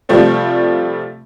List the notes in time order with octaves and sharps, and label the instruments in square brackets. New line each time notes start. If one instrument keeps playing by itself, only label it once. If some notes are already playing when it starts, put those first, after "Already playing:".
[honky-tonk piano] C3 F3 G3 A3 C4